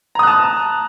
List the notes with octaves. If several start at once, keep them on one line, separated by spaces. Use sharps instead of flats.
A5 A#5 D#6 F#6